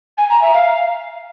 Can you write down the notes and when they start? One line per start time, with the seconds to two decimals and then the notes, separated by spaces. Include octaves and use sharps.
0.17 G#5
0.29 A#5
0.41 E5
0.53 F5